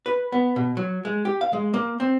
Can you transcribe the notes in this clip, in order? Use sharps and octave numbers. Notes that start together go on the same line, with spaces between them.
B4
B3
B2
F#3
G#3
G4
F5
G#3
A#3
C4